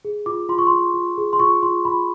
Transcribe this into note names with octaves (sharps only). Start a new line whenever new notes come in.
G#4
F4 D6
F4 C6
C#6
F4 C6
F4
G#4
C6
F4 C#6
F4 C6
F4 B5